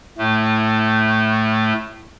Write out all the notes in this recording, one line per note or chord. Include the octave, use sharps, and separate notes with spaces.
A2 A3